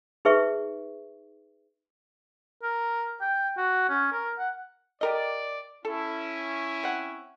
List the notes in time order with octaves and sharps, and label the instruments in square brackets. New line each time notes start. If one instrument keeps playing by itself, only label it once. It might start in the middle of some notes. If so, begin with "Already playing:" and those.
[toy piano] D#4 G#4 B4 E5 C#6
[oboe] A#4
G5
F#4
C#4
A#4
F#5
[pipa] G4 A#4 D#5 [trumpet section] D5
[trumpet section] C#4 E4 [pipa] A4
[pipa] C4 F#5